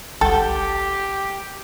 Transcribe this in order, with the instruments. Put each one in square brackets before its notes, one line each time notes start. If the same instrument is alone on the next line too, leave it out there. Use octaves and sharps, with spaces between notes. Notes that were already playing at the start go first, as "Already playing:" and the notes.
[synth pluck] G1 C2 F#5 [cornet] G4 [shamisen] A4 [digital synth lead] G5